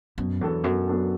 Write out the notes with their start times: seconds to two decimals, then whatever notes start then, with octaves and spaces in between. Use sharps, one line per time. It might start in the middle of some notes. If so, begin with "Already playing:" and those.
0.18 F#2 B2
0.41 E2 F#3 B3 D4 A4
0.64 F#2 B2
0.88 F#3 B3 D4 A4